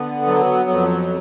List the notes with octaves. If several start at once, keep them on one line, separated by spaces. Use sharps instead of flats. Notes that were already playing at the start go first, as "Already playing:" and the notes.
Already playing: D3 B3
F#3
F2